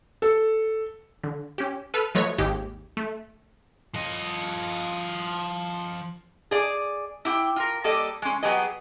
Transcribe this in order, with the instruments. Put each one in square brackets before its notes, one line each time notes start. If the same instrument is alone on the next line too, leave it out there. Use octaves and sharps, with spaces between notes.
[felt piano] A4
[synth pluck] D3
C#4 G4
A4 B4 F6 D#7
F3 F#3 A3 B4 C#5 D#5
G#1 D#2 D#3 G4 G#4
A3
[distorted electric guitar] F3 D#5
[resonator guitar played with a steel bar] G#4 D5
E4 G4 G5
F4 A#4
G3 A#3 G4 A4 D5 D#5
G#3 C#4
F#3 B3 G4 G#4 D#5